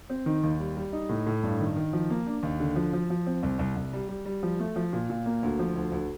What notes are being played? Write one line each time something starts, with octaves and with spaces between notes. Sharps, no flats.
C4
D#3
D#2
G3
G3
D#4
A2
A2
G2
D#3
D#3
F3
A#3
D4
D#2
D3
F3
F3
F3
C4
C2
C2
C2
G3
G3
G3
F3
A3
F3
A#2
A#2
A#3
D2
F3
D2
D2